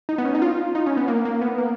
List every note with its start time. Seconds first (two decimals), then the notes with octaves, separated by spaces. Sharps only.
0.09 D#4
0.18 B3
0.25 C#4
0.35 D#4
0.42 F4
0.75 D#4
0.86 C#4
0.97 B3
1.08 A#3
1.25 A#3
1.41 B3
1.58 A#3